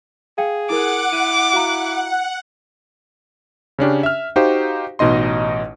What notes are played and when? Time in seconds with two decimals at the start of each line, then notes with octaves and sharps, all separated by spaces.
0.38 G#4 F5 G5
0.70 E4 A#4 F#5 D6
1.13 E4 D#7
1.53 F#4 F5 A#5
3.79 C#3 C#4 D4 G4
4.03 E5 F6
4.36 D#4 F#4 G4 C5 F5
4.99 A1 B2 D#4 D#5 C6